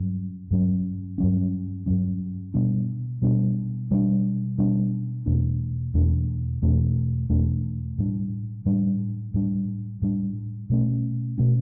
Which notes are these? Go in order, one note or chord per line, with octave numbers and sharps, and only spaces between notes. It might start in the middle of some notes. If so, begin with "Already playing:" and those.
Already playing: G2 F#3 C#4
G2 F#3 C#4
G2 F#3 C#4
G2 F#3 C#4
B2 G3 B3 D4
B2 G3 B3 D4
B2 G3 B3 D4
B2 G3 B3 D4
E2 B2 A3 D4
E2 B2 A3 D4
E2 B2 A3 D4
E2 B2 A3 D4
A2 G3 D4
A2 G3 D4
A2 G3 D4
A2 G3 D4
B2 A3 C#4
B2 A3 C#4